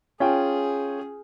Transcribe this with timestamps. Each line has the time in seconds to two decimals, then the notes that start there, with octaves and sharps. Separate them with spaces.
0.20 C#4 F4 G#4 G5